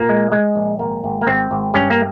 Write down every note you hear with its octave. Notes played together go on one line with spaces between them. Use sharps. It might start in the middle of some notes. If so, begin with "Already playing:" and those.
Already playing: A#2 A#3
G#3
G#3
A#1
G#1 A#3
G#1
A#3
G#1 C4
G#1
G2 C#4
A#3